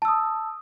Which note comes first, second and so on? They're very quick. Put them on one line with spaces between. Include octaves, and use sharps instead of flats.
A5 E6 D#6